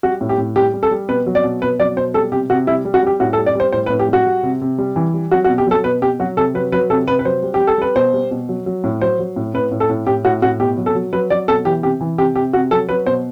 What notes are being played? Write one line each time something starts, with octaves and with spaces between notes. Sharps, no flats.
G3 F#4
A2
G4
A2
G3 G4
G3
A4
G3
B2 B4
F#3
D5
B2
B2 B4
F#3 D5
B2 C5
G3 A4
C3 G4
C3 F#4
G3 E4
G3
F#4
G3 G4
A2 F#4
A4
G3
D5
G3 C5
A2 C5
B4
A2
G4
G3 F#4
G3
C3
C3
G3
E3
G3
F#3 F#4
F#4
B2
G4
F#3 A4
B2 B4
B2 G4
F#3 F#4
C3 A4
F#3 B4
F#3 B4
C3 A4
C3 B4
B4
F#3 C5
G3
G4
G3
A4
G3 B4
B2 C5
G3
B2
F#3
F#3
A2
F#3 C5
F#3
A2
A2 B4
A2
A4
A2
A2 G4
A2 F#4
A2 F#4
B2 G4
F#3
A4
F#3
F#3 B4
F#3 D5
B2 A4
E3 G4
C3 G4
E3
C3 G4
C3 G4
C3 F#4
F#3 A4
F#3 B4
B2 C5